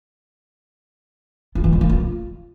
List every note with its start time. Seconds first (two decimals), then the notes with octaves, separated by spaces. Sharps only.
1.55 F4
1.64 E3
1.72 G#3
1.81 A#3
1.90 F4